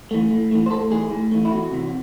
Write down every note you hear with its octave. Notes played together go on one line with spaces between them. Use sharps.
E3 A3
A2
E3 A3
C5
A2 A4
E3 A3 G#4
A2
E3 A3
E4
E2 F#4
C3 E3